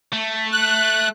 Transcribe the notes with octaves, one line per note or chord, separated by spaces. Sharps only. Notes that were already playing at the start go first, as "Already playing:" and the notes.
A3
F#6